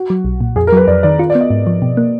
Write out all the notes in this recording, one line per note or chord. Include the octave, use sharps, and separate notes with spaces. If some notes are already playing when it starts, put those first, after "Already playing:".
Already playing: F#4
F#3
B1
A#2
F2 G#4
A#4
F#3 B4
F2 D5
D#3 D5
F4
D5
B3
D#5
G#2
F3
B2
A#3